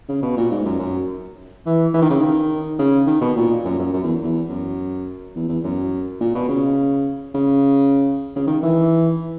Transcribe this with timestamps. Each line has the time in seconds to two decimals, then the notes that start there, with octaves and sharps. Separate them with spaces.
0.09 C#3
0.22 B2
0.37 A#2
0.51 G#2
0.65 F#2
0.79 F#2
1.66 E3
1.93 E3
2.02 D#3
2.10 C#3
2.19 D#3
2.79 C#3
3.07 D#3
3.21 B2
3.36 A#2
3.65 F#2
3.79 F#2
3.93 F#2
4.03 E2
4.23 E2
4.49 F#2
5.35 E2
5.49 E2
5.64 F#2
6.20 A#2
6.34 B2
6.48 C#3
7.34 C#3
8.36 C#3
8.47 D#3
8.62 E3